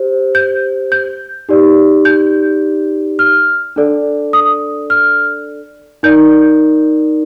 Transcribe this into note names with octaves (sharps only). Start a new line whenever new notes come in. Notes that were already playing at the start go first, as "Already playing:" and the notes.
Already playing: G4 C5
G6
G6
D#4 G4 D5
G6
F6
D4 A4 D5
D#6
F6
D#4 A#4 D5 G6